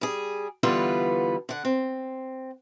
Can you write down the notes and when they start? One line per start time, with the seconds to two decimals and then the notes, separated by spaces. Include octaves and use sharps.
0.01 G3 G#4
0.63 D3 E3 G3 B3 F4 B4
1.49 D3 F#5
1.65 C4